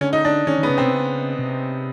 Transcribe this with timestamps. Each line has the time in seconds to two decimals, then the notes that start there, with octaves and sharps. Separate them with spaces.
0.01 D3 C#4
0.13 D#4
0.25 D4
0.47 D#3 C#4
0.59 D#3 B3
0.70 C#3
0.78 C3 C4
0.93 C#3
1.39 C3